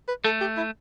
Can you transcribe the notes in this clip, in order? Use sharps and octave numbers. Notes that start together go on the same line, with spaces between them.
B4
A3 A4
G4
E4